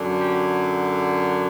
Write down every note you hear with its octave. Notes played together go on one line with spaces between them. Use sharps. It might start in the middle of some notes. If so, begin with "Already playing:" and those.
Already playing: F#2 D3 F#3
G4